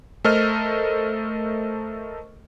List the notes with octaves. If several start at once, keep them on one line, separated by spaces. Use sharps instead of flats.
A3 A4 A#4 C5 D#5 F6